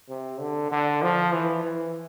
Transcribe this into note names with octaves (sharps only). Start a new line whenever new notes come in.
C3
D3
D3
F3
E3
E3